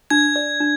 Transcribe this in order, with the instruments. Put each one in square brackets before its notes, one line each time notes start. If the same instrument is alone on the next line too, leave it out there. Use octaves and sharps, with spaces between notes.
[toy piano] D4 [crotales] G#6
[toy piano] D5
D4